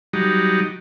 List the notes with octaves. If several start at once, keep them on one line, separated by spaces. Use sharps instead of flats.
F#3 G3 D#4